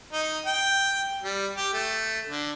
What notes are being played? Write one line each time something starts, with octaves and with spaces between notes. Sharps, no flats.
D#4
G5
G3
G4
A3
D3